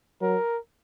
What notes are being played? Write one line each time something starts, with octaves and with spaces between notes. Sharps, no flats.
F#3 A#4